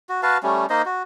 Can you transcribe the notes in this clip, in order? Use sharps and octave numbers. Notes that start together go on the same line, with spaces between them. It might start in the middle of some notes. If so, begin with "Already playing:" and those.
F#4
F#4 B4 F5 A5
G3 A3 C#4
A#3 D#4 C5 D#5
F#4